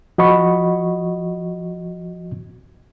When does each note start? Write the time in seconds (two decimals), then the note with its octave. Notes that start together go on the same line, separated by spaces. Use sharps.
0.18 F3 F#4 D#5 B5 C#6